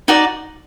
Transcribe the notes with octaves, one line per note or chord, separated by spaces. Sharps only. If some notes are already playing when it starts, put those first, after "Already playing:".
D#4 F#4 D5